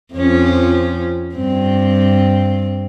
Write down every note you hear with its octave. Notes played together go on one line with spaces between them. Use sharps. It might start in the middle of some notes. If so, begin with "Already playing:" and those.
F2 F3 C#4
G2 C4